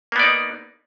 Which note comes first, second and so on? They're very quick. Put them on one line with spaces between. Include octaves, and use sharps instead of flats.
A#3 B3 D5 D#4